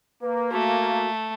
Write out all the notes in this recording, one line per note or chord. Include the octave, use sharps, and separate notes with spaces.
A#3 B4
A3 F#4